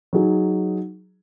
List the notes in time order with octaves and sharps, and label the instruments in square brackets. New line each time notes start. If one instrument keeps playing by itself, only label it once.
[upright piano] F#3 D#4 G#4